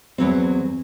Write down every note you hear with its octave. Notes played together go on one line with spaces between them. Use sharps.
E2 F#3 C4